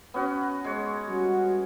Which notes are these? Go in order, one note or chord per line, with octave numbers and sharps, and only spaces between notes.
B3 C#4 F#4
G#3 C#5
G3 C#4 F#4